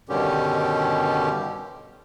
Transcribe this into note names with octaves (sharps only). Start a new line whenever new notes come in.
G2 B2 D3 D#3 C#4 G4